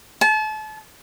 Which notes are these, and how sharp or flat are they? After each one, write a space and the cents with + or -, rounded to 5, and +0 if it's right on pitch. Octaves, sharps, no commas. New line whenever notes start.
A5 -35